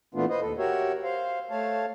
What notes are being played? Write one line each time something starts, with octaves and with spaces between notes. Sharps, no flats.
A#2 E3 A3 B3 D4 F4
B4 C5 D#5
D#2 A4
F#4 G4 A#4 C#5 E5
C5 F5
A3 C#5 F5 A5